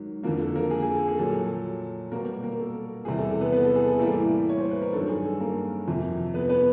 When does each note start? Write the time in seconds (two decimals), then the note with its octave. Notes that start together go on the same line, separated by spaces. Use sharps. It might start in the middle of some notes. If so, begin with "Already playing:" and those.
Already playing: G#2 D#3 F#3
0.23 F2 D3 F3 A#3 A#4
0.40 A4
0.56 A#3 A#4
0.71 G#4
0.82 G#4
0.94 A4
1.08 G#4
1.18 A#2 F#3 A4
2.12 B2 A#3 A#4
2.16 G3
2.43 A#3 A#4
2.59 A4
3.05 E2 C3 E3 G3 G#4
3.18 A4
3.29 A4
3.41 B3 B4
3.52 B3 B4
3.64 A4
3.76 G#4
3.88 A4
3.99 A2 E3 G3 A#3 A#4
4.49 C#5
4.60 C5
4.71 B4
4.82 A#4
4.93 G2 A4
4.95 D#3 F#3
5.09 G#4
5.24 A4
5.40 A#3 A#4
5.87 F2 C3 F3
6.34 B3 B4
6.49 B3 B4